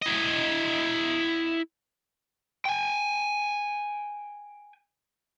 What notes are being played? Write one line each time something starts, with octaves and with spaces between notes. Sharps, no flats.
E4 D#5
G5 G#5